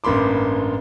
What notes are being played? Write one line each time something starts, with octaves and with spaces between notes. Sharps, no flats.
A1 G2 A#3 B5 C6 D6